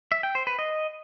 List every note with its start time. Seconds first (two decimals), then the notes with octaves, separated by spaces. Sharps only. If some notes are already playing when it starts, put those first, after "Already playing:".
0.12 E5
0.23 G5
0.35 C5
0.47 B4
0.59 D#5